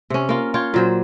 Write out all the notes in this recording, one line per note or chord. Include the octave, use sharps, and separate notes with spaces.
C3 C#4
A#3 F4
F4 C#5 G5
A#2 F#3 C5